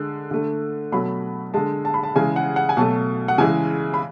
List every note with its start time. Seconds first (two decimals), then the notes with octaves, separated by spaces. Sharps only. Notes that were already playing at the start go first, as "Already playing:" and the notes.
Already playing: D3 G#3
0.31 D3 A3
0.92 B2 F#3 A3 B5
1.54 D3 G#3 A5
1.85 A5
1.94 B5
2.03 A5
2.15 C#3 E3 G#3 G#5
2.36 F#5
2.56 F#5
2.69 G#5
2.77 B2 F#3 A3 A5
3.28 F#5
3.38 C#3 E3 G#3 G#5
3.94 B5